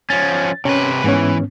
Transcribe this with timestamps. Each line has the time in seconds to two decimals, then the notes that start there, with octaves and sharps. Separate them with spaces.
0.10 F3 C#4 A6
0.65 C3 C#4 B4
1.04 G#2 E3 B3 C#4